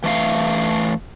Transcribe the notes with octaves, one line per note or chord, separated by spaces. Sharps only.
E3 A3 F5